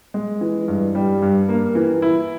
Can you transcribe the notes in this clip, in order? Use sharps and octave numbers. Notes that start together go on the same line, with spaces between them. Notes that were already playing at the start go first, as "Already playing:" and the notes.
G#3
E3
G2
G3
G2
A#3
E3
E4